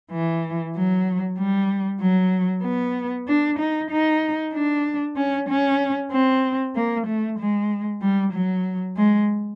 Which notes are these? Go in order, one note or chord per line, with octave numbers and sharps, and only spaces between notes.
E3
F#3
G3
F#3
B3
D4
D#4
D#4
D4
C#4
C#4
C4
A#3
A3
G#3
G3
F#3
G#3